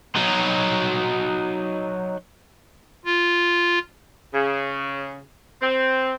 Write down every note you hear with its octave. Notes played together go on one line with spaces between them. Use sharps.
F#3 D#4
F4
C#3
C4